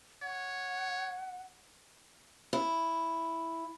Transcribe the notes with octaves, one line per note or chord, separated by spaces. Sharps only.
C#5 F#5
E4